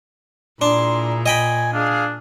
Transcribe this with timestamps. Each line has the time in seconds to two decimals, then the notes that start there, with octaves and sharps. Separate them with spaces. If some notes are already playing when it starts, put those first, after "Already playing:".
0.61 A#2 D4 E4 G#4 A#5 C6
1.26 D#5 G5 G#5 B5
1.73 D4 G#4 F5